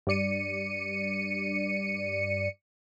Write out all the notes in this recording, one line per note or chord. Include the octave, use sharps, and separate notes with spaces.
G2 G3 D5 C#7 D#7